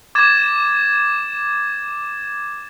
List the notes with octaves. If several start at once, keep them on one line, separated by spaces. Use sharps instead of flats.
D6 G#6 A6 E7